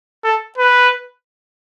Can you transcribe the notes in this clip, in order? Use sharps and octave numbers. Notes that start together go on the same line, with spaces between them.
A4
B4